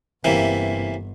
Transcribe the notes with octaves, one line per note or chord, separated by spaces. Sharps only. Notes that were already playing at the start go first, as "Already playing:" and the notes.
G1 C3 E3 A#3